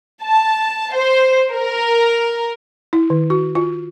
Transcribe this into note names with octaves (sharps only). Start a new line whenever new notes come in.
A5
C5
A#4
E4
D#3
F#4
F4